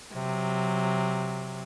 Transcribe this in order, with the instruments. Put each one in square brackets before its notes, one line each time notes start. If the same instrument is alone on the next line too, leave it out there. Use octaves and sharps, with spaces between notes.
[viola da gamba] C3 F#3